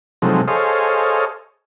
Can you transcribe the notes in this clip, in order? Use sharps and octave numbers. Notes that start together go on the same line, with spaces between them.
C3 F3 F#3 G#3 A3 D#4
G#4 A4 C5 C#5 D#5 F5